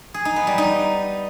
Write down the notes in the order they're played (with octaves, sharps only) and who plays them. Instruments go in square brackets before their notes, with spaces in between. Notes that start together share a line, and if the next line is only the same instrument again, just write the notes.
[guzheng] G#4
D#4
B3
G3
D#4